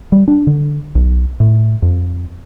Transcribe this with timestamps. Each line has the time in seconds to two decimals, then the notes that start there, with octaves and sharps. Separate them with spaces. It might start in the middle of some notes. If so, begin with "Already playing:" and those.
0.12 G3
0.28 D4
0.47 D3
0.95 B1
1.40 A2
1.82 F2